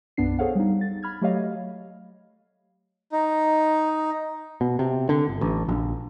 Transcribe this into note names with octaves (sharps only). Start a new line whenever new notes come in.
B1 F#2 B3 D4 C7
G#4 A4 C5 C#5 F5 F#5
G3 D#4
A6
B5 F6 G#6
F#3 A3 G4 C#5 D#5 F5
D#4
B2
C3
D3
G1
A1
A#1